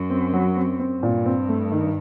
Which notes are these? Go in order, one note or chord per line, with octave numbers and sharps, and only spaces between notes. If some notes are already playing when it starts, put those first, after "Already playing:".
Already playing: F#2
C4
F#3
C4
C4
G2 A#2
C4
A3
D#3